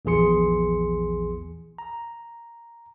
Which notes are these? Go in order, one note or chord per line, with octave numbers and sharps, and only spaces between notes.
A#1 E2 E3 G#4 C6 C#7
A#5